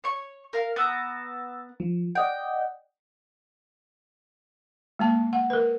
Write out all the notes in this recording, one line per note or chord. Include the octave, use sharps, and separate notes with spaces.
C#5 C#6
A#4 F5
B3 A#5 E6 A6
F3
D5 D#5 F#5 G5
G#3 A#3 A5
F#5
A#4 B4